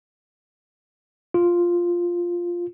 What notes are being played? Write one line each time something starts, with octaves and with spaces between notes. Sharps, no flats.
F4